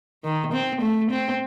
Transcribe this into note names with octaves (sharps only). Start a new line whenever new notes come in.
D#3
C4
A3
C4